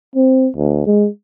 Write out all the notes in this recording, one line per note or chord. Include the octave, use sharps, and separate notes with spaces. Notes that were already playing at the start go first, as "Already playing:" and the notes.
C4
D2
G#3